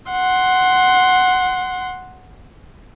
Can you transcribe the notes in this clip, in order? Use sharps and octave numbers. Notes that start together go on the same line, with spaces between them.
F#5 C6